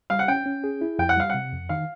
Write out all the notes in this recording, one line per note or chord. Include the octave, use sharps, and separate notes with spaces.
G3 F5
F#5
C#4 G5
C#4
G#4
E4
F2 G5
F#5
G3 F5
C3 F#5
F2
D#3 F5